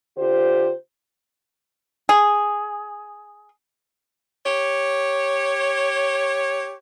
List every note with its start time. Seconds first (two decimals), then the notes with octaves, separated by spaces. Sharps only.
0.17 D3 F4 G4 C5
2.09 G#4
4.45 G4 C#5